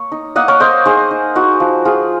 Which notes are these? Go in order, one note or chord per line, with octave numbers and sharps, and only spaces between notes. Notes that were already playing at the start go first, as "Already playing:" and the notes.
Already playing: A#3 C#5
D#4
A#3 D#5 F#5
A#4 C#5
A#3 C5 D#5
D#4 G#4 C5
D#4
D#4 F#4 A#4
F3
F3 F4 G#4